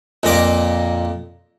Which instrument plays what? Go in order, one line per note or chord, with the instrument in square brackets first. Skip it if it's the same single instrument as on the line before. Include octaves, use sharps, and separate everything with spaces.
[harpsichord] F2 A#2 D#5 D6